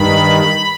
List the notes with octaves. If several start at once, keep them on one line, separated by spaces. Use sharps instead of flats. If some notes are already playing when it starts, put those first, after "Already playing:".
Already playing: G2 D#3 B5